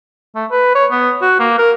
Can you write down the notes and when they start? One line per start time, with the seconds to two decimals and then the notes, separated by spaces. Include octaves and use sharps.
0.35 A3
0.51 B4
0.75 C#5
0.92 B3
1.22 F#4
1.40 A#3
1.59 A#4